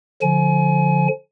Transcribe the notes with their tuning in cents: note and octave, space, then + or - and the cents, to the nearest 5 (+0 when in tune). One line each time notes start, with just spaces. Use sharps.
D3 -10 F3 +10 G#5 +30